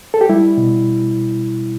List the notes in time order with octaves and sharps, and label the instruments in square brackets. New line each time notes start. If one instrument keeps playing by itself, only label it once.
[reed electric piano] A4
G4
G3 E4
B2